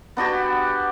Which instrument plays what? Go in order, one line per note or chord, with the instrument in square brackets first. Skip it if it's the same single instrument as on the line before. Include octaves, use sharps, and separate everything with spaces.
[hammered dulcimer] B3 D4 F#4 G4